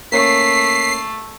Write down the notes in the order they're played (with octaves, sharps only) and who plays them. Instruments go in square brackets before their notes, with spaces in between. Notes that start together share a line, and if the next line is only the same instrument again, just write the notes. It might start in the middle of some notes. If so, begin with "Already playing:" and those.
[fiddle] A3 [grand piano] A#3 C#4 [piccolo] B6 [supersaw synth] C7